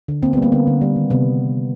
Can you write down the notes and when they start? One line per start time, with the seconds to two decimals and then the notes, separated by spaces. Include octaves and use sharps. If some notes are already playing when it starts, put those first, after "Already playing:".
0.08 D3
0.22 A#3 C4
0.33 B3
0.37 G3
0.42 A#3
0.52 D3 B3
0.67 D3
0.81 G3
0.96 D#3
1.10 C3 B3